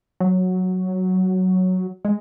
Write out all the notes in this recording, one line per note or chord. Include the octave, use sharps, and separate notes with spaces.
F#3
G#3